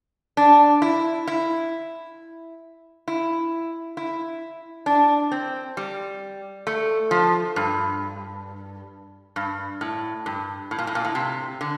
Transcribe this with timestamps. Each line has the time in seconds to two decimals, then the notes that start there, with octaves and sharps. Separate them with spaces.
0.37 D4
0.82 E4
1.27 E4
3.08 E4
3.97 E4
4.86 D4
5.31 C4
5.77 G3
6.67 A3
7.11 F3
7.56 G2
9.36 G2
9.81 A2
10.26 G2
10.71 A2
10.79 A#2
10.87 A2
10.95 A#2
11.05 A2
11.15 C3
11.61 D3